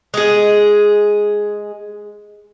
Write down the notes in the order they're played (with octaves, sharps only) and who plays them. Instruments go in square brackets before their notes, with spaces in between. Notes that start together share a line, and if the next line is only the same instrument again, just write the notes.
[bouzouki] G#3 G#4